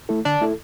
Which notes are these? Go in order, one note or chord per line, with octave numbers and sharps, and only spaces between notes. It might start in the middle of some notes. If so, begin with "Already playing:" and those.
A3 E4 A4
D3 D4
A3 E4 A4